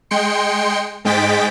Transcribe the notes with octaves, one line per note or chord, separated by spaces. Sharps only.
G#3 G5 C6 C#7
G#2 G#3 G5 A6 B6 D7